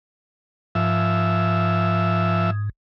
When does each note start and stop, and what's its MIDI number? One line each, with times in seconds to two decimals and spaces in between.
0.75 2.69 44
0.75 2.50 53
0.75 2.50 76